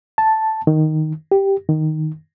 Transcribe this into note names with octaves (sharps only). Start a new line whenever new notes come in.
A5
D#3
G4
D#3